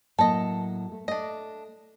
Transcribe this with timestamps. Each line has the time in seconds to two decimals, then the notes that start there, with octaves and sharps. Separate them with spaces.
0.19 A2 F#3 A#3 A4 D#5
0.92 A3
1.08 A3 D4 D#5